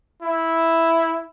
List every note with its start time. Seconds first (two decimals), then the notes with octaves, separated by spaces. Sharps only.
0.23 E4